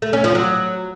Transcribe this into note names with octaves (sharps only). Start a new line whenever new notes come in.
A3
C#4
F3
F#3